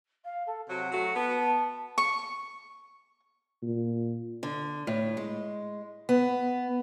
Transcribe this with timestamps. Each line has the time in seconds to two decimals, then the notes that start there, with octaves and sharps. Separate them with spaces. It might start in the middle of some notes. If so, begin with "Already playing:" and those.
0.24 F5
0.46 A4
0.69 C3 F#3 F#4 F#5
0.92 F#3 A3 F#4
1.15 B3 A5
1.36 A5
1.98 C#6
3.62 A#2
4.43 D3
4.87 A2
5.17 G#3
6.09 B3